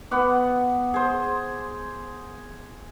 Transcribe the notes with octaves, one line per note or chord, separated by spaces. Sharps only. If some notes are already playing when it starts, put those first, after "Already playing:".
B3 F#5 D6
G#4 C5